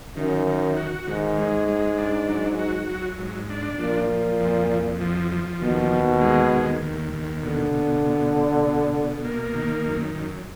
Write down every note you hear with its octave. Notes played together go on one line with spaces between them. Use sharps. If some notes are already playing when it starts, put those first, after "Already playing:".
F#2 D#3
D#3
F#4
G#2 D#3
G#3
G#3
D4
F#3
F#4
F#3
G#2
D4
A#2 F3
F3
F2
F2
F3
F3
D#2 B2
D#2
G#3
D#2
D#2
D#2
B2 D3
B2
B2
B2
B2
B2
A#3
D#3
F#2
F#2